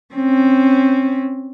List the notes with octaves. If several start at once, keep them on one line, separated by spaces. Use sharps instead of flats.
C4 C#4